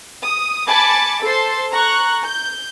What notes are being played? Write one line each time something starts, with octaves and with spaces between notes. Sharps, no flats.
D#6
G#5 A5 B5 D6 A6 C#7
A4 C5 A5 C6
A#5 C#6 F#6
G6